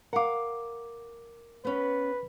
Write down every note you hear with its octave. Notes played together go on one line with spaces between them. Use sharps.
A#4 F5 F#5 D6
B3 C#4 B4